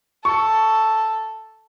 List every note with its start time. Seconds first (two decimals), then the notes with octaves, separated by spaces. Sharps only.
0.24 A4 C#6